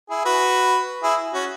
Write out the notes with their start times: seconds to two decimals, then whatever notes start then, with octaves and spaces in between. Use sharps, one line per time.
0.10 E4 G#4
0.25 F#4 B4
1.03 E4 G#4
1.34 C#4 F#4